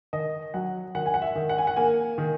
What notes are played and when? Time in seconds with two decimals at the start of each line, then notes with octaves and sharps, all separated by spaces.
0.13 D#3 D#5
0.54 F#3 F#5
0.95 D#3 F#5
1.06 G#5
1.14 F#5
1.22 E5
1.35 D#3
1.49 F#5
1.58 G#5
1.67 F#5
1.76 A#3 G#5
2.18 D#3